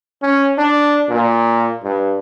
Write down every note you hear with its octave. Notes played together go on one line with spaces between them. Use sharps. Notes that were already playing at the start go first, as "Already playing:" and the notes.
C#4
D4
A#2
G2